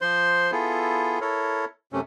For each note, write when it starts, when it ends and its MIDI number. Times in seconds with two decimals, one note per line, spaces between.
0.01 0.51 53
0.01 0.51 72
0.01 0.51 84
0.52 1.19 59
0.52 1.19 64
0.52 1.19 65
0.52 1.19 68
0.52 1.19 69
1.21 1.65 64
1.21 1.65 69
1.21 1.65 70
1.21 1.65 73
1.93 2.01 42
1.93 2.01 48
1.93 2.01 57
1.93 2.01 61